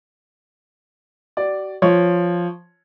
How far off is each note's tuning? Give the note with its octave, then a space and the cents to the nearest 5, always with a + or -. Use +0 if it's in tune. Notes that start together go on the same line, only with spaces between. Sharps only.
F#4 +45 D5 +0
F3 +0 C#5 +0